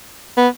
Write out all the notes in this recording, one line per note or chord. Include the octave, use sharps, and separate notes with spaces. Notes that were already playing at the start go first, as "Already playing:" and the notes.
B3